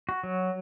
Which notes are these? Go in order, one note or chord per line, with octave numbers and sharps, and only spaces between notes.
F#4
F#3